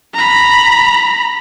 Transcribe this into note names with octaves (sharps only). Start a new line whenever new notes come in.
A#5 B5